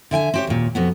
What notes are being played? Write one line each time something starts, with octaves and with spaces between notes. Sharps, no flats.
D3 E5 G5 G#5
C4 G4 C#5
D#2 A#2
F2 B2 B3